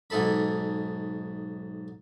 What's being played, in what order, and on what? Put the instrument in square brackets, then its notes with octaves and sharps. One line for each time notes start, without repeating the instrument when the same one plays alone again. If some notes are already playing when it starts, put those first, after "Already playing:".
[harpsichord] B1 G#2 G#4 A4 B5